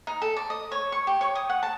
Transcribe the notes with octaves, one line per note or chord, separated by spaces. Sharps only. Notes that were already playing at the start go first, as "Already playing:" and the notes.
D#4
A4
D5
D#5
C#5
C#6
G4
C#5
D#6
F#5
A5